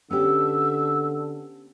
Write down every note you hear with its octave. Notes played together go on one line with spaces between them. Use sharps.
D3 B3 C#4 G4 E6